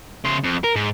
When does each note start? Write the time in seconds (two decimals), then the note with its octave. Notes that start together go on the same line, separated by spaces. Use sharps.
0.25 C#3 C5
0.44 F2
0.64 A#4
0.76 G#2